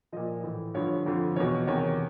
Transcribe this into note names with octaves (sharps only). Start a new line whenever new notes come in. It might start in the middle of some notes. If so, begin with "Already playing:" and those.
A#2 F3 D#5
A2 E3
G2 D3 F3 C#5
F2 D3 F3
E2 B2 C#5
E2 C3 D#3 C#5